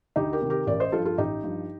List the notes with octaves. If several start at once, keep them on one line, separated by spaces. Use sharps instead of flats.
D2 D#4 G4
G4 A#4
C3 D#3
G4 A#4
A1 A#4 D5
C5 D#5
G2 F3 F4 A4
F4 A4
A1 D#4 G4
G2 F3